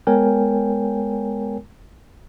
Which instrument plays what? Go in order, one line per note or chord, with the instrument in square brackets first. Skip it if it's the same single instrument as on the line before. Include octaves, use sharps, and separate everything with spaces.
[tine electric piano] G#3 B3 A#4 C#5 G5 G#5